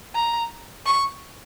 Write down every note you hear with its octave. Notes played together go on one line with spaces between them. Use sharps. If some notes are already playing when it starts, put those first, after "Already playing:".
A#5
C#6